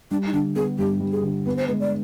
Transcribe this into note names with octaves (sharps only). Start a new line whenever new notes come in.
G3 D4
D#4
D3 D4
B3 G#4
G2 G4
G3
G#4
D3
B3 B4
C5
G#3 B4
D5